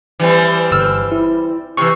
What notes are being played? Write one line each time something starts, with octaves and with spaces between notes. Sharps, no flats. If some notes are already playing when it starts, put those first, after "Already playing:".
E3 G3 C4
G1 E6 F6
E4
C3 E3 C#6 E6